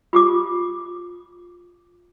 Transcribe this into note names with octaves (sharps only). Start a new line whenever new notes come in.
F4 G4 D6